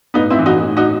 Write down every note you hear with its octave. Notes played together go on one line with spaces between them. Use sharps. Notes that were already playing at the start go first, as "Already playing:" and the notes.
A2 B3 D#4
C4 E4
E3
D#4 F#4
A2
D#4 F#4